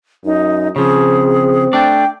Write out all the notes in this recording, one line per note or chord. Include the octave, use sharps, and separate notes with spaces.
F#2 D#4
C#3 F3 C4 G#4
A3 D4 D5 G5